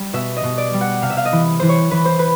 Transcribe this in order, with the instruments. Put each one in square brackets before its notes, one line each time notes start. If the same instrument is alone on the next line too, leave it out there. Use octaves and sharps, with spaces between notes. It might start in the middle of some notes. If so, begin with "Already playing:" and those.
Already playing: [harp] G3
B2 E5
D#5
B2
D5
G3
F#5
C3 F5
E5
F5
D#5
E3
E3 C5
C#5
E3 B4
C5
B4